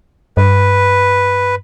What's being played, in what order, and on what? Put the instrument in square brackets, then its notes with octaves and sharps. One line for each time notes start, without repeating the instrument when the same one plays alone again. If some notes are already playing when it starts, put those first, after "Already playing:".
[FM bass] G2 [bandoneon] B4